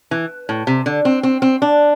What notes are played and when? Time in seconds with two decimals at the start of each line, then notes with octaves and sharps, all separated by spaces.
0.11 E3
0.49 A2
0.67 C3
0.86 D3
1.05 C4
1.23 C4
1.42 C4
1.62 D4